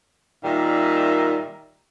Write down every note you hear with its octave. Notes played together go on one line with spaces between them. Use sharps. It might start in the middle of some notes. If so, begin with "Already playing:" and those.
A#2 D#3 G3 A#4 E5 A#5